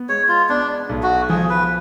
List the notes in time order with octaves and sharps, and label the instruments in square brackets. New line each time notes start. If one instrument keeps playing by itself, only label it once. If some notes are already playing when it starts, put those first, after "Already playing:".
Already playing: [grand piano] B3
[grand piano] G#3 [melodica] C#5
[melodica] F4
[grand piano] B3 [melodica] D4
[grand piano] B1
[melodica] F#4
[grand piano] F3 [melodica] G#4
[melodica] B4